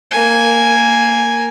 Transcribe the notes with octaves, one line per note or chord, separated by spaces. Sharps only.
A#3 G#5